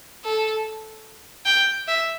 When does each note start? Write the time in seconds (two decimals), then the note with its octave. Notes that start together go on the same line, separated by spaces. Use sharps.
0.24 A4
1.47 G5
1.88 E5